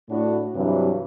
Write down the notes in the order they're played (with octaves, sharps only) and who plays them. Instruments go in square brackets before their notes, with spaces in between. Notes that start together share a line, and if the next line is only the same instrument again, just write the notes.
[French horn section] A2 A3 D4 F#4
G2 C3 E3 F#3